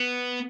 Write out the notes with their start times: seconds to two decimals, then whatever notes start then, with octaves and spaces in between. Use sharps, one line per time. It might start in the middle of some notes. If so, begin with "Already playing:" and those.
Already playing: B3